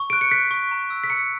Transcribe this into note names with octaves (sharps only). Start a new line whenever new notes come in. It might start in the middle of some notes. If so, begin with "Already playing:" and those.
Already playing: C#6
F#6 D7
C#7
F#6 B6
C#6
A#5
E6
B6
A#5 C#7